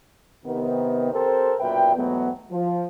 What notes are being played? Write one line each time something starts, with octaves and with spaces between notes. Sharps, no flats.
C3 D#3 B3
C4 G4 A4 A#4 C5
B1 F#2 A#2 B4 E5 G5
E2 G#2 F#3 A3 B3
F3